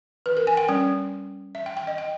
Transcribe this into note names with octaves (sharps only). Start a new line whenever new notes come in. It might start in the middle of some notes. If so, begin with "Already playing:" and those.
B4
A#4
G#5
G5
G3 C#4 G5
E5
G5
G5
D#5
G5